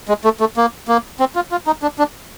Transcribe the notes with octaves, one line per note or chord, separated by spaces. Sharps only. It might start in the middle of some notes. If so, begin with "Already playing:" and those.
G#3
A3
A3
A#3
A#3
C4
F4
F4
D#4
D4
D4